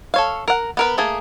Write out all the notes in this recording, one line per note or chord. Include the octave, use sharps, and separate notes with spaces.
A4 C#5 F5
A#4 F#5
B3 A#4 B4
A3 A#3 G#4